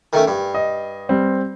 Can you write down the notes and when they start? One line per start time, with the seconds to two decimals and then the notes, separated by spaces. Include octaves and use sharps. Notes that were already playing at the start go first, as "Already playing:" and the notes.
0.13 D#3 A3 C#4
0.28 G2
0.54 D#5
1.09 G3 C4